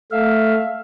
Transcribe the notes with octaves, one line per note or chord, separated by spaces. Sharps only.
A3 E5 F5